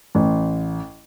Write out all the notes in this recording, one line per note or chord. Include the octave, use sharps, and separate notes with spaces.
A1